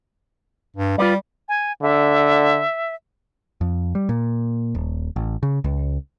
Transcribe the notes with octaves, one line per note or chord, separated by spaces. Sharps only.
G2
G3 F4 B4 D5
G#5
D3 E5
F2
G3
A#2
D#1
A1
C#3
C#2